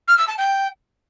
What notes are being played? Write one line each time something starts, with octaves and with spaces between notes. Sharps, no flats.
F6
E6
A5
G5